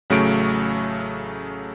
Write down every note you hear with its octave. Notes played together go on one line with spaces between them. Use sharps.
A1 C#3 F#3 A3 C#6 D7